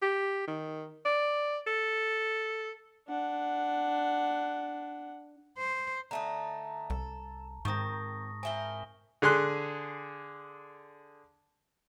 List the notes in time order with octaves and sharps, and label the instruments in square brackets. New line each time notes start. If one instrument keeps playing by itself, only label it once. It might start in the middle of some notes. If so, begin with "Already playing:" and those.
[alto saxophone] G4
D#3
D5
A4
[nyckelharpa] D4 F#5
[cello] C5
[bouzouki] D3 A3 D#4 [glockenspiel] A5 A#5
[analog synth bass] C2 [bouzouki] A4
[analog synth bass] G#2 [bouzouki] D#3 C4 [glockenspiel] C#6 D#6 A#6
[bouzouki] C4 E4 A#4 [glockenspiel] G#5 G7
[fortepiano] D3 G#4 C6 F#6